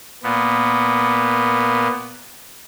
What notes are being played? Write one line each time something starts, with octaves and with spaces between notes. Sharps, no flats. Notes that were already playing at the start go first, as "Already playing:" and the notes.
A#2 B3